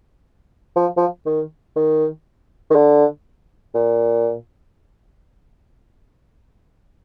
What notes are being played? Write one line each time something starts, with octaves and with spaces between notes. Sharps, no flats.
F3
F3
D#3
D#3
D#3
D3
A#2